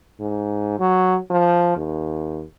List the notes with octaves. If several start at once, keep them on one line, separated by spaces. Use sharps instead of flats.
G#2
F#3
F3
D#2